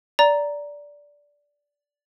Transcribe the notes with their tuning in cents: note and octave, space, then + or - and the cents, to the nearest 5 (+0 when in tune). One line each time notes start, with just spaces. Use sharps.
D5 -10 A#5 +0